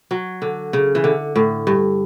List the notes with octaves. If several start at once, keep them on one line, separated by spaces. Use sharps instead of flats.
F#3
D3
C#3
E3
D3
A2
G2